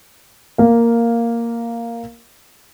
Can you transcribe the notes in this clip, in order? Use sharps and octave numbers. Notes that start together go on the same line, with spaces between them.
A#3 F5